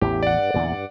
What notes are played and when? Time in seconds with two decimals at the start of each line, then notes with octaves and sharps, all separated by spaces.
0.01 A1 E2 E3 G4
0.23 D5 F#5
0.37 G2
0.54 E2 A#2 D3
0.72 G2